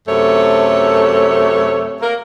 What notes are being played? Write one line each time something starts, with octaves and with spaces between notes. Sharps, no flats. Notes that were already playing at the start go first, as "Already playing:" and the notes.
F#2 C3 A3 A4 C#5
A#3 A#4